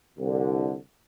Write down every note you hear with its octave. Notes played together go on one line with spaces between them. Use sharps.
C2 D3